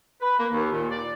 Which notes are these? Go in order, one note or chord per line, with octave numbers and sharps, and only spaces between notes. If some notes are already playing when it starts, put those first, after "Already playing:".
B4
A#3
D#2
A#2
D5